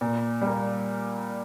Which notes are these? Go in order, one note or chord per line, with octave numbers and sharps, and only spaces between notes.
A#2
G3 A#3